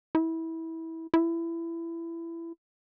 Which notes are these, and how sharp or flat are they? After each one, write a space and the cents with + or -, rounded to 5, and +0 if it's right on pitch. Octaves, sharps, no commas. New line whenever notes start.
E4 -20
E4 +20